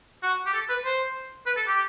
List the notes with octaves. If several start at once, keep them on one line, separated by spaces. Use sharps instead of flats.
F#4
G4
A4
B4
C5
B4
A4
G4